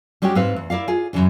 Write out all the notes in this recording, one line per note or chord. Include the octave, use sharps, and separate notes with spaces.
G3 G#3 C#4 F#4 G4
G#2 C4 B4 F5
E2
E4 A#4 D5 F5
F4 G#4
F#2 A#2 C#3 E3